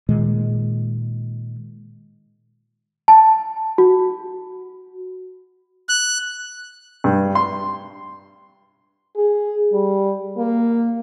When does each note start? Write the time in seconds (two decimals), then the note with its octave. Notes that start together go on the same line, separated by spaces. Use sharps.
0.09 A#2 D#3 G#3
3.08 A5
3.78 F#4
5.89 F#6
7.04 G2
7.35 C6
9.16 G#4
9.73 G3
10.38 A#3